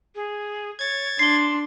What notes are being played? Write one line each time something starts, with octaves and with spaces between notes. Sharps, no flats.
G#4
C#5 G#6 A6
D4 C6 C7 G7